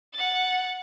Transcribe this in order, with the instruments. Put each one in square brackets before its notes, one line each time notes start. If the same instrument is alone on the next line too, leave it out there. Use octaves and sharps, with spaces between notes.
[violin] F#5 A6